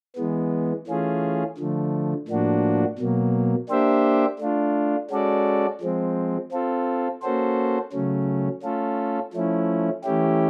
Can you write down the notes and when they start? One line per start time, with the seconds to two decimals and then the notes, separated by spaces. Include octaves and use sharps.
0.16 E3 G#3 B3
0.87 E3 A3 C#4 F4 G#4
1.58 D3 F3 A3
2.28 A2 F3 A#3 D4 F#4
2.99 B2 F#3 A#3
3.69 A#3 D4 G4 C5 E5
4.39 A3 D4 F4
5.10 G#3 C#4 F#4 A4 D5
5.81 F3 G#3 C4
6.51 C4 F4 A4
7.22 A#3 C#4 F#4 A4 C5
7.92 C#3 F#3 A3 C#4
8.63 A3 C#4 F4 A4
9.33 F3 A3 C#4 E4
10.04 E3 A3 C#4 E4 G4